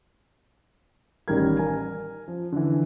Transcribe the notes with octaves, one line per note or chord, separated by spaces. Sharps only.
A1 D#3 G3 C#4 A#4 G#6
A#4 G#5
F3
D3 E3